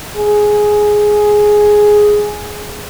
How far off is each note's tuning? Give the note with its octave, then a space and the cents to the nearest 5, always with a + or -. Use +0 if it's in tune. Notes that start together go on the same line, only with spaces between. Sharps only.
G#4 +5